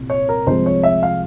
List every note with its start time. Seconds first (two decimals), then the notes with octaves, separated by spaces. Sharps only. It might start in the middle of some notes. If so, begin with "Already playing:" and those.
Already playing: C2 A#2
0.10 C#5
0.29 A#4
0.47 C2 C3 F3 G#3 C5
0.66 C#5
0.83 E5
1.03 F5